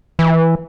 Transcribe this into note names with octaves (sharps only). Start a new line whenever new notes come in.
E3